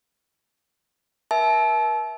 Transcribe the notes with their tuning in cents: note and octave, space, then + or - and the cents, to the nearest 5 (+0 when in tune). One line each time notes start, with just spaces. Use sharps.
A#4 +40 E5 -10 A5 -35